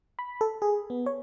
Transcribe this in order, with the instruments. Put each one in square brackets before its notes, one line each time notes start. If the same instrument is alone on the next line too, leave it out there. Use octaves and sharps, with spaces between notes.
[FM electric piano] B5
A4
G#4
B3
C#5